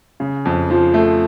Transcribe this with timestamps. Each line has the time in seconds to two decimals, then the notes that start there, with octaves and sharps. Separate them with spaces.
0.20 C#3
0.45 F2
0.70 F3
0.94 A3